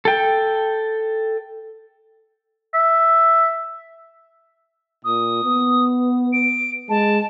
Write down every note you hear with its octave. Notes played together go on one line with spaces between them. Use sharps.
A4 G5
E5
A#2 D#6
B3
D7
G#3 A5